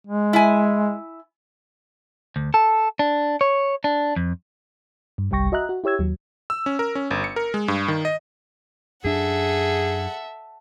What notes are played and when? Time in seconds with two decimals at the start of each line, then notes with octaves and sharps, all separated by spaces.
0.07 G#3
0.33 E4 G#5
2.36 D2
2.54 A4
2.99 D4
3.41 C#5
3.84 D4
4.16 F2
5.18 G2
5.31 G1 C2 G3 G5 C#6 A#6
5.52 F#4 D#5 E5 A#5 F#6
5.69 F#4
5.84 E4 G4 C#5 E6 G#6
5.99 D#2 F#3
6.50 E6
6.66 C#4
6.79 A#4
6.95 C#4
7.11 G1
7.24 C#7
7.36 A#4
7.54 G#3
7.68 G2
7.88 D#3
8.05 D#5
9.05 F#2 D4 G#4 A4 E5 F#5